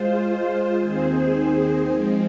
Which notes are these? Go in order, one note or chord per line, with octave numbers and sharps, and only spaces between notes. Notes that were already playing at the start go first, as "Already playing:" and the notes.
Already playing: G#3 F4 C5
D#2 D#3 C4 G#4 C5
F3 G#3 C4